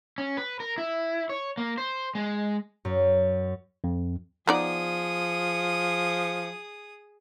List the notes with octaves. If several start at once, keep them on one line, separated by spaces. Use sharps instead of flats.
C#4
B4
A#4
E4
C#5
A#3
C5
G#3
F#2
F2
F3 B3 D#4 G#4 D5 D#6